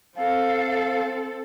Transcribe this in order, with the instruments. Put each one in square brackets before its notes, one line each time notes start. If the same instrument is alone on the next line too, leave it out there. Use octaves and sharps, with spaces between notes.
[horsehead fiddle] C4 A4 [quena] F5